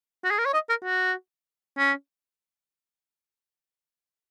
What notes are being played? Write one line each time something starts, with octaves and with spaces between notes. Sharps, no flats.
F#4
G#4
A#4
C#5
D#5
A#4
F#4
C#4